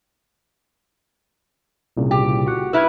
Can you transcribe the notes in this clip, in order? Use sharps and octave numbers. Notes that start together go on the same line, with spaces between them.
C2 A#2 C#3
G4
F#4 F#5
E4 B4 E6 F6 G#6